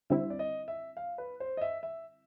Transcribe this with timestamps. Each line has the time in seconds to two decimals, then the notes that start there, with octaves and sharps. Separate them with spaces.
0.10 D3 G3 C4 E4 E5
0.30 D5
0.39 D#5
0.68 E5
0.97 F5
1.18 B4
1.40 C5
1.57 D#5
1.61 E5
1.83 E5